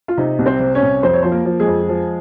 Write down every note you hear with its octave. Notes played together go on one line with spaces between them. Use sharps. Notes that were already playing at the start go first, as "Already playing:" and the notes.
F4
C3 D#4
C2
C4 C5
C3
C#4 C#5
C2
F2 C4 C5
C#5
F3 C5
A#3 A#4
F3
G#3 G#4
F2
F3